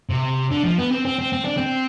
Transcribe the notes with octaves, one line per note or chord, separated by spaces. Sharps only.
C3
D3
F3
B3
C4
C4
C4
C4
D4
C4